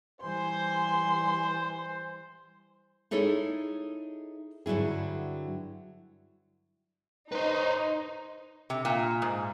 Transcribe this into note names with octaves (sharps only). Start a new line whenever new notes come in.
E3 G3 C5 G#5 C6
D#4 E4 G#4 A4 C#5
G2 D3 F#3 E4 G#4
D#4 B4 C5
C3
A#2
G#2